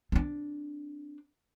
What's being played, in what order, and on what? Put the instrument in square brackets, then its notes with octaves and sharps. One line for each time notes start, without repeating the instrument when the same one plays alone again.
[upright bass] C4 D4